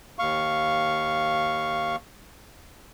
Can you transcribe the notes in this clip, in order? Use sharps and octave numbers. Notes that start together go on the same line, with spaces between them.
D#2 F5 C#6